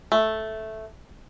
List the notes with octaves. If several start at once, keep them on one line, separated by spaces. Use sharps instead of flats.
A3